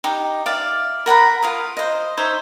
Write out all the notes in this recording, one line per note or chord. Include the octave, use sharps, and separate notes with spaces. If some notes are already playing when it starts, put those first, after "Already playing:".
D#4 G4
D5 E5 F5 D6
A#4 F#5 A#5 B5
F4 A#4 D#6
C5 D#5
D#4 C5 C#5 E5